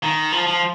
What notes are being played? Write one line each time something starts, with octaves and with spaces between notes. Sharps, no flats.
D#3
F3
F3